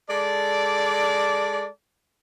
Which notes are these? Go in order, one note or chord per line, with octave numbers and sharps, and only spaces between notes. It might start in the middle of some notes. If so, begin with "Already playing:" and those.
G#3 A4 D5